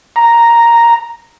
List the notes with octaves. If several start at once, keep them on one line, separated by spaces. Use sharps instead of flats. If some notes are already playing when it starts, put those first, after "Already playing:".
A#5